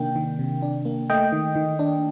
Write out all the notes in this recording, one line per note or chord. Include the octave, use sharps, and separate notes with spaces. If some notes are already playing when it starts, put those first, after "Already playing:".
Already playing: C3 D#3 A#3 D4 G5
D#3
C3
D4
A#3
A3 D#5 G5
D#3
D#3
D4